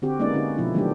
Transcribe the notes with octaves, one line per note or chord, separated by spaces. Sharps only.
D3 C4 F#4 G4
G#3 A#3 B3 C#4 D#4 D5
D3 C#4 D#4 F#4
B2 F3 E4
D#3 F#3 A3 B3 D4 G4